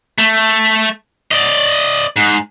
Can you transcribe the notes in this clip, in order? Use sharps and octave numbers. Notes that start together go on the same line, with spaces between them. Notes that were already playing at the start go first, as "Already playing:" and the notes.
A3
D5 D#5
G#2